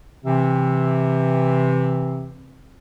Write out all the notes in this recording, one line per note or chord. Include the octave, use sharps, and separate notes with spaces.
C3 E3 C4